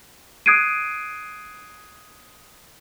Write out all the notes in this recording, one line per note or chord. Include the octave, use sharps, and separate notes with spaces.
D#6 F#6 G#6 C7 D7 D#7